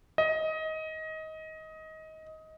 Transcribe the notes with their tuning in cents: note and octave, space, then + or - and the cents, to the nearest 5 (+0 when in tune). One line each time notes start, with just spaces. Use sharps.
D#5 +20